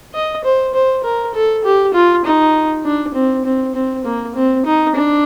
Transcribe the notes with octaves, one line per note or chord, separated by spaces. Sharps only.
D#5
C5
C5
A#4
A4
G4
F4
D#4
D4
C4
C4
C4
A#3
C4
D#4
D4